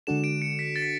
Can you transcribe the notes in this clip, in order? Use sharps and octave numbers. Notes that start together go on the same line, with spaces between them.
D3 G#3 D4 F#4 A4 E7
D7
C#7
B6
A6
B6